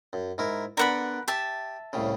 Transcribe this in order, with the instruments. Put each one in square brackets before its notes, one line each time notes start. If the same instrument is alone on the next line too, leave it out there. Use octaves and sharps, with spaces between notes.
[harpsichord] F#2
G#2 E4 A#4
[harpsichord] D3 B3 D4 [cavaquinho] A#4 F#5 B5
[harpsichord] G4 [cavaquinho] E5 A5
[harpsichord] C2 A2 C#3